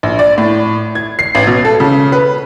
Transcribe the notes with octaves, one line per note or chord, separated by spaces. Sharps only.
A#1
D5
A2
G#6
C7
A1
B2
A4
C#3
B4